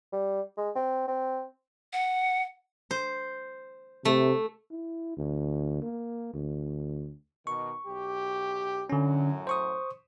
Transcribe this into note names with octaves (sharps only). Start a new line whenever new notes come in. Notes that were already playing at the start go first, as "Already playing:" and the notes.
G3
G#3
C4
C4
F#5
C5
C3 A3
E4
D2
A#3
D2
B2 D#3 C#6
B1 G4
F#2 A2 D3 F#3 C#4
C5 C#6 D#6